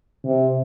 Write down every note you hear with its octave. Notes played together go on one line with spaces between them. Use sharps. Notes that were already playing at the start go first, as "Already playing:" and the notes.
C3